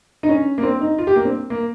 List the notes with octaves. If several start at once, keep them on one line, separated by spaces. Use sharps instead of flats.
D#4
C#4
A#3
C4
D#4
F4
G4
A#3
C4
A#3